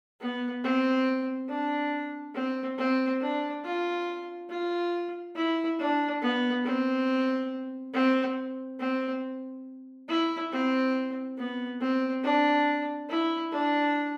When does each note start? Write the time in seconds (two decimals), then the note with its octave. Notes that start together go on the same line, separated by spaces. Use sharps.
0.20 B3
0.64 C4
1.49 D4
2.35 C4
2.78 C4
3.21 D4
3.64 F4
4.50 F4
5.36 E4
5.79 D4
6.22 B3
6.65 C4
7.94 C4
8.80 C4
10.09 E4
10.52 C4
11.38 B3
11.81 C4
12.24 D4
13.09 E4
13.52 D4